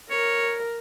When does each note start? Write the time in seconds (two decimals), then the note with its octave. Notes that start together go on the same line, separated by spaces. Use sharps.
0.10 A#4 C#5